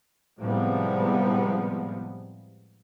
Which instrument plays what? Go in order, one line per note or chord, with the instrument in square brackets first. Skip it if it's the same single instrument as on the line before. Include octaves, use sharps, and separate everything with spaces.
[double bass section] A2 C3 F3 G3 G#3 B3